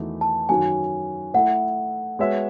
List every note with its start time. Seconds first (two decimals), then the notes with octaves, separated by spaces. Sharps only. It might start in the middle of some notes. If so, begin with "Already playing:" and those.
Already playing: E2 D#3 A3 D#4 F#4
0.21 A5
0.49 F#2 D#3 F#3 C#4 F#4 G#5
1.34 A3 E4 A4 F#5
2.19 G#3 B3 F#4 C#5 E5